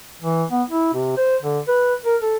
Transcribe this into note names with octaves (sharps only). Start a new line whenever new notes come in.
E3
B3
E4
C3
C5
D3
B4
A#4
A4